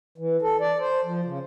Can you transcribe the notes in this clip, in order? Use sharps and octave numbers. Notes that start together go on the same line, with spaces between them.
E3
A4
D5
C5
F3
C#3